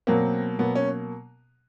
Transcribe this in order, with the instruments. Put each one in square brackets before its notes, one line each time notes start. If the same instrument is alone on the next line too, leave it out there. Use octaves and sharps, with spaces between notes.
[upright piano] B2 F#3 A#3 [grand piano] C4
[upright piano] B2 F#3 A#3 [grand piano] B3
[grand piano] C#4